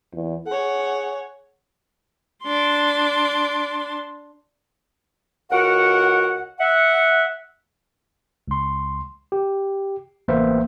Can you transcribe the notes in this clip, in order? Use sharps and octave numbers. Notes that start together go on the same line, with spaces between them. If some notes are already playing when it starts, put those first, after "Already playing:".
E2
G#4 C#5 F#5
D4 C6
C#2 F#4 A#4 F#5
E5 F#5
C#2 C6
G4
A1 A#3 B3 B4 C5 E5